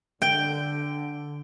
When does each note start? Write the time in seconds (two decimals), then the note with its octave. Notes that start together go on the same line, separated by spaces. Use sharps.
0.22 D3 G5